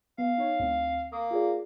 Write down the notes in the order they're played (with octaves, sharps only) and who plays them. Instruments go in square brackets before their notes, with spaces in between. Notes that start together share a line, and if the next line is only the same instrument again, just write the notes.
[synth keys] B3 [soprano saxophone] F5
[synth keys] D#4 C#5
D2 C4
[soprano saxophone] A#3 [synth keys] D#6
[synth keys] F4 G#4 D5